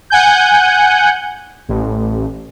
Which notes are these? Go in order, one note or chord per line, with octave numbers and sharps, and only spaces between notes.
F#5 G#5 G6
A1